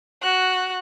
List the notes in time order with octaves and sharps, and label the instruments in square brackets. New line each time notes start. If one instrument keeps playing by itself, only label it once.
[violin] F#4 F#6